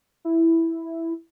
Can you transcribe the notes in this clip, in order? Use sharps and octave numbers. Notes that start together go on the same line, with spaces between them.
E4